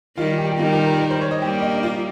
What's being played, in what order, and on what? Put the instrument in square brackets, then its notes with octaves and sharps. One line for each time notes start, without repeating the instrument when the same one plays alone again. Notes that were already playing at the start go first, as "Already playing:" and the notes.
[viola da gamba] D#3 G3 [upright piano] F4
[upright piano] G4
G4
[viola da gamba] D#3 G3 [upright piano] F4
[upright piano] G4
A#4
A#4
C5
C#5
D#5
[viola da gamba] G3 A#3 [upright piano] G4
[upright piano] D#4
D#4
F4